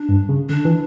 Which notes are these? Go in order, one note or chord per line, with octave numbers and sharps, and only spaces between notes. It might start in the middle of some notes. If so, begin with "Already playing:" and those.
Already playing: D4
G2
C#3
D3 D4
E3